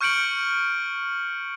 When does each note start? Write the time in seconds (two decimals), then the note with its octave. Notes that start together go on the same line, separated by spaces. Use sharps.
0.01 C#6 F6 G6 C#7 D7 F#7